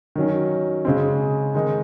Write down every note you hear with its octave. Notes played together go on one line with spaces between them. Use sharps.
D#3 F#3 C#4
C#3 G#3 C4
D#3 G#3 D#4